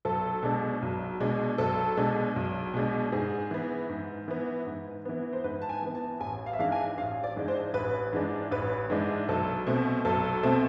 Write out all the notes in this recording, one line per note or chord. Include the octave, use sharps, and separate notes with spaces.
B1 A4
B2 G#3 D4
B1
B2 G#3 D4
B1 A4
B2 G#3 D4
B1
B2 G#3 D4
G#2 G#4
E3 B3
G#2
E3 B3
G#2
E3 B3
C5
G#2 B4
A5
G#5
E3 B3
A5
A1 G#5
F5
E5
G#2 E3 G#3 D4 F5
G#5
A1 F5
D5
G#2 E3 G#3 D4
C5
A1 B4
G#2 E3 G#3 D4
A1 B4
G#2 E3 G#3 D4
B1 A4
B2 A3 C4
B1 A4
B2 A3 C4